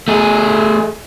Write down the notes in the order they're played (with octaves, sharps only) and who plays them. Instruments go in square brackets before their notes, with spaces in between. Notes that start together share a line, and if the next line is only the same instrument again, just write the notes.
[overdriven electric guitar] A3 G#4